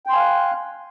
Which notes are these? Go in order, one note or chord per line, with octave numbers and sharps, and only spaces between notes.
F5 G5 G#5 C6 F#6